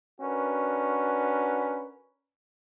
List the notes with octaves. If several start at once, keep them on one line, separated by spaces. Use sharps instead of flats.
C#4 D4 F#4 A#4 B4